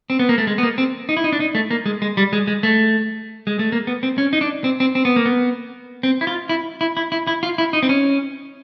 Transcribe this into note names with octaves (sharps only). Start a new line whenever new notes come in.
C4
B3
A#3
A3
G#3
B3
A#3
C4
D#4
E4
D#4
D4
D#4
A3
A#3
G#3
G#3
G3
G#3
G#3
A3
G#3
A3
A#3
B3
C4
C#4
D#4
D4
C4
C4
C4
B3
A#3
B3
C4
E4
F4
E4
E4
E4
E4
E4
F4
E4
D#4
C4
C#4